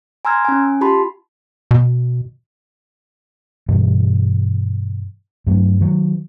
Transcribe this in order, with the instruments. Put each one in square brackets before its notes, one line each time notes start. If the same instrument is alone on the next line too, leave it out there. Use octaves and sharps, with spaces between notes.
[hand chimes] G#5 A#5 C6 E6 F6 G#6
C#4 G#5
F4 G4 A5 B5 C6
[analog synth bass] B2
[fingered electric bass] G2 B2 E3 G3
G2 F#3 A3
D#3 F#3